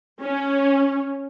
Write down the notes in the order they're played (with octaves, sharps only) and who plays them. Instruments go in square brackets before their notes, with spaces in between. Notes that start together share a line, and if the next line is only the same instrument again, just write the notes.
[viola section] C#4